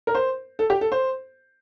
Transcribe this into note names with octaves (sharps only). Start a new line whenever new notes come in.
A#4
C5
A4
G4
A4
C5